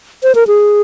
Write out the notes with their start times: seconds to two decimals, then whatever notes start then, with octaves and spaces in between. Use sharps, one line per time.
0.23 C5
0.35 A#4
0.47 G#4